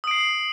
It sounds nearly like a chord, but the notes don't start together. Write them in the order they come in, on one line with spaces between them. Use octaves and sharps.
D#6 D7 C7